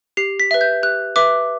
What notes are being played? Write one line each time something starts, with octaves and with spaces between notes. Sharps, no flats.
G4 C7
B6
B4 E5
G6
G4 F#6
B4 E5 D6